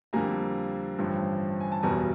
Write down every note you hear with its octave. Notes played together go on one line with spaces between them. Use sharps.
F2 D3 G3 A#3 G#5 A#5
A1 G2 D3 F3
G#5
A5
F#1 E2 B2 G3 G#5 A#5